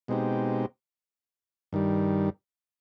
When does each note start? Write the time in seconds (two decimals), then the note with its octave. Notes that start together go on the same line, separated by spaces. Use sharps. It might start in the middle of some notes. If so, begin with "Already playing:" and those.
0.08 B2 G#3 C4 D#4 G4
1.73 G2 D#3 G3